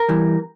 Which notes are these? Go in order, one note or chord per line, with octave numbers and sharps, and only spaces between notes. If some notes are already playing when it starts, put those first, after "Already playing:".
Already playing: A#4
E2 E3 G3